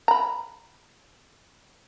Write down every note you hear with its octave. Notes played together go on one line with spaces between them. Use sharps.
A#5 B5